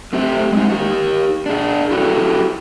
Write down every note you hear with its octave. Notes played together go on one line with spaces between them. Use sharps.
A3 C4 G4 E5
G#3 D#4
D#4 G4
D4 G#4
E4 F#4 G4 A4